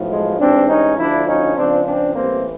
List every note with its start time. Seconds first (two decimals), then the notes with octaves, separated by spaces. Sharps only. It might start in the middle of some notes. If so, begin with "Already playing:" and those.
Already playing: B1 A2 F3
0.10 G#3
0.39 A1 G#2 E3 C4 D4
0.69 C#4 D#4
0.97 D2 D3 F3 D4 E4
1.27 C#4 D#4
1.55 C#2 C#3 F3 C4 D4
1.85 C4 D4
2.14 A1 A2 E3 G3 A#3 C4